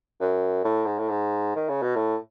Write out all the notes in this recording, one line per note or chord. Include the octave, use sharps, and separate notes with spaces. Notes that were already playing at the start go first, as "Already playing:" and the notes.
F#2
A2
G#2
A2
G#2
D#3
C#3
B2
A2